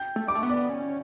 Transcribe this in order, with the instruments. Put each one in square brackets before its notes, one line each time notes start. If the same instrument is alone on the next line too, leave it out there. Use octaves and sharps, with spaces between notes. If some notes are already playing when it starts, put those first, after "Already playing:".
Already playing: [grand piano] G5 G6
[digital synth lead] A3
[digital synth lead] G3 [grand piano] D6
[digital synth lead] A3
[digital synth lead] B3 [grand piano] C#6
[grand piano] D5 D6
[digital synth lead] C#4